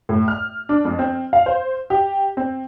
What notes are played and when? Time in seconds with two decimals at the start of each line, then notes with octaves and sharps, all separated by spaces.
0.09 A2
0.28 F6
0.69 D4
0.85 F2
0.99 C4
1.33 F5
1.46 C5
1.90 G4
2.37 C4